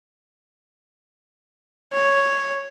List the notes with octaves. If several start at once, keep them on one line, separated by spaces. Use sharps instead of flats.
C#5